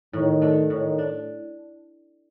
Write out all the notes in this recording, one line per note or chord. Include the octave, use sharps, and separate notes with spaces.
A2 D#3
A3 D4
A2 D#3
D4